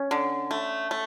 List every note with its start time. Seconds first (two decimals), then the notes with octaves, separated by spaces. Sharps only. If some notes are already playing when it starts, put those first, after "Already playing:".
Already playing: C#4
0.11 D3
0.51 A3
0.91 A3